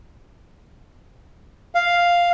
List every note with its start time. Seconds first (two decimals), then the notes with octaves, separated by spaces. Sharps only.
1.75 F5